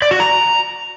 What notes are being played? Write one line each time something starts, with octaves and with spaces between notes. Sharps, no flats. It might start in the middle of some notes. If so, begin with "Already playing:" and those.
D5
F#4
A#5